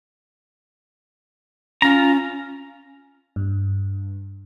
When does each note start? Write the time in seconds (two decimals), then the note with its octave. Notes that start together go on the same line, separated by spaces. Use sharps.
1.82 C#4 F4 A#5
3.36 G2